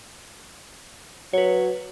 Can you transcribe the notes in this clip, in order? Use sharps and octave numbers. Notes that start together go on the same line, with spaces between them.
F#3 B4 C#5